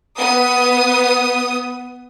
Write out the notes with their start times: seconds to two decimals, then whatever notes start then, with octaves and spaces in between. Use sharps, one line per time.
0.17 B3 D#6